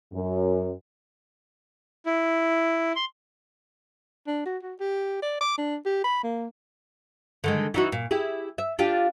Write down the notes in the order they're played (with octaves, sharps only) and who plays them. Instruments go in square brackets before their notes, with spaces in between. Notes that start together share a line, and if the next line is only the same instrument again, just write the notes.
[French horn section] F#2
[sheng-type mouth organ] E4
C6
[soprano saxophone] D4
F#4
F#4
G4
D5
D6
D4
G4
B5
A#3
[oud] D3 D#3 G#3
E3 D#4 F#4
A#2
E4 G4 G#4
E5
D4 F4 G4